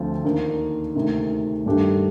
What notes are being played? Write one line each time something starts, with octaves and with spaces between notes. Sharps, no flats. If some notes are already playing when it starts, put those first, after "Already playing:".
Already playing: D2 D3 F3 C4 F4
D#2 D#3 A#3 D4
D2 C3 D#3
G2 D#3 A3 D4 G4